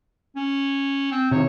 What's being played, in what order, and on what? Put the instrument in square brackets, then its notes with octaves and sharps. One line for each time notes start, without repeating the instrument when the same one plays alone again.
[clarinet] C#4
C4
[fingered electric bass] C3 D#3 [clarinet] C#5